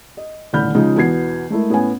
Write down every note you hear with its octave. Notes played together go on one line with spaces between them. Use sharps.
D#5
D#1 A2 D3 B5 F6 G6
C#3 F3 G#3 D#4 F4
E2 B2 B3 G#6 C7
G#3 A3 E4 A#4
A2 B3 C#4 G#5